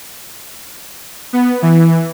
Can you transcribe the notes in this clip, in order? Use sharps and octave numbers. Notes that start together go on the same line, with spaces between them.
B3
E3